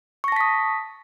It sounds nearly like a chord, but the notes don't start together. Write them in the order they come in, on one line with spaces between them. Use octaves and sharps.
C#6 A#6 A5 B6 D#6